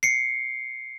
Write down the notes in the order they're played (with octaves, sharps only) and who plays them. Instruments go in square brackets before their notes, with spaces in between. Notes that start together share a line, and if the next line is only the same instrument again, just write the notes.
[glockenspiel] C7 C#7